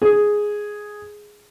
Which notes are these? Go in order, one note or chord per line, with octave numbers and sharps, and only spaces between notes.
G#4